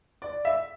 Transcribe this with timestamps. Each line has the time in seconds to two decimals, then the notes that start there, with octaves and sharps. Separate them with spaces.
0.22 D5
0.45 E5